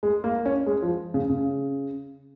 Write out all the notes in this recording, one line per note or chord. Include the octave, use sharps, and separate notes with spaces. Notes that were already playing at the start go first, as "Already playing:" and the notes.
G#3
A#3
C#4
G#3
F3
C#3
C#3